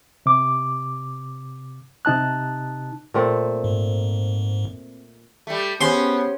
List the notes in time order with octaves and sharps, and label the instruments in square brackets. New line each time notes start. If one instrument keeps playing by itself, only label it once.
[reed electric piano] C3 D6
C3 D#4 A5 F#6
[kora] A#2 A3 C4
[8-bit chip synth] G#2
[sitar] G3 A3
[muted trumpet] B3 [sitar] C#4 [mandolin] G4 G#4 C5 [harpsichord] C6